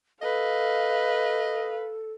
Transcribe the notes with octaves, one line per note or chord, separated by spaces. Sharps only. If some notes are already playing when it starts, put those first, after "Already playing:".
A4 B4 D#5 F5